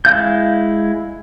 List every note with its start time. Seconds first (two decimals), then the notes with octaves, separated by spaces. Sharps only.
0.05 G#3 E4 F5 G6